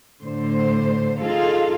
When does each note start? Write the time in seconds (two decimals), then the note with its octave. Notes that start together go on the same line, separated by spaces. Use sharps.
0.23 A2 D3 C5
1.21 D#4 F4 G#4 A4 F5